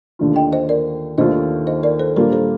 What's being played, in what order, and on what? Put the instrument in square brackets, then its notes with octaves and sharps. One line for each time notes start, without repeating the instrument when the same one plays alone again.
[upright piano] D#2 D3 A3 D4 F4
[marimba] D#5 G5
C5 D#5
A#4 D5
[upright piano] D#2 D#3 A3 D4 F4 [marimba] C5 D#5
[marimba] C5 D#5
A#4 D5
A4 C5
[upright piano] A#2 G3 A#3 D4 F4 [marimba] G4 A#4
[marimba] A4 C5